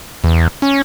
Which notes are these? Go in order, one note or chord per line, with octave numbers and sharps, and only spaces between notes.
E2
C#4